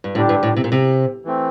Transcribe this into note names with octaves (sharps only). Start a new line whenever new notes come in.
G2
A2 D3 G3 D4 G4
G2
A2
C3
A#2
C3
E3 A3 C4